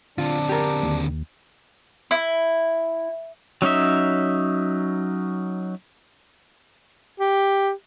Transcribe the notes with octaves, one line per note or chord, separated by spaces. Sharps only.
D3 C4 D4 F4
G4 A#4
D#2
E4
F#3 C#4 D#4 E5
G4